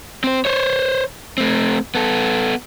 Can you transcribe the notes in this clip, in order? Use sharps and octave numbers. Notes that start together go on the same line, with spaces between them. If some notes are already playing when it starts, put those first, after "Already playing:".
C4 C5
C5 C#5
A3 C4
B3 A4